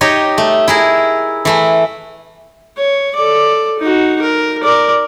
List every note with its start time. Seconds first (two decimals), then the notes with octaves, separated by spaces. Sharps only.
0.01 D#4 G4 C#5 D#5
0.38 A3
0.68 E4 G#4 A#4
1.45 E3 A3 E4
2.77 C#5
3.15 A4 D5
3.79 D#4 F#4
4.22 A#4
4.64 A#4 D5